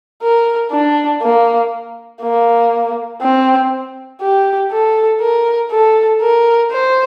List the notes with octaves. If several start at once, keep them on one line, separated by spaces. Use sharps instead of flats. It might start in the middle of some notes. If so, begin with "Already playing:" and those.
A#4
D4
A#3
A#3
C4
G4
A4
A#4
A4
A#4
C5